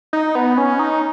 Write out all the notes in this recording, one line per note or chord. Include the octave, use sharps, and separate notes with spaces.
D#4
B3
C#4
D#4